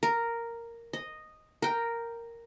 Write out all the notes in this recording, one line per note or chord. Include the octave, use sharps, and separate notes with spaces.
A#4
D#5
A#4 G5